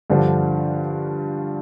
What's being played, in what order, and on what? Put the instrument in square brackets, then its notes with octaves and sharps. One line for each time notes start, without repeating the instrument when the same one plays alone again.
[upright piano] G2 D3 F3